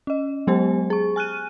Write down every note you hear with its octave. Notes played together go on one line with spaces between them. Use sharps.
C#4 D#5
F#3 G#3 B3 G4 C5 G#5
G#4 C#6
G#5 F6 F#6 D#7